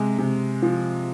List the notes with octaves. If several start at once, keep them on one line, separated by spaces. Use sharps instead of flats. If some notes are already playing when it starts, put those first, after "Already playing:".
Already playing: C3 G#3
C3
F3